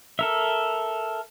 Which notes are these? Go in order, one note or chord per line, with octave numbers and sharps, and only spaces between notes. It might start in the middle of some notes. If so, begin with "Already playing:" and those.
A4 A#4 E5